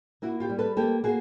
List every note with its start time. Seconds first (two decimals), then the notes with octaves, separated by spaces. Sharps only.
0.22 A#3 E4 F#4
0.40 F4 G4
0.49 G3
0.58 A4 B4
0.77 A#3 G4 A4
1.04 A#3 F#4 G#4